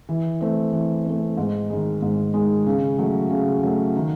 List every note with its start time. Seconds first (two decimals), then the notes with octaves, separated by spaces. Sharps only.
0.09 E3
0.41 A3 C4
0.73 E3
1.05 A3 C4
1.37 G#2
1.70 D#3 G#3
2.02 G#2
2.34 D#3 G#3
2.66 C#3
2.98 F#3 A3
3.30 C#3
3.63 F#3 A3
3.96 D#3